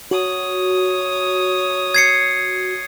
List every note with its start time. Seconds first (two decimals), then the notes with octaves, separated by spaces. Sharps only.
0.11 F#4 C#5 D#6
1.94 G#6 C7 C#7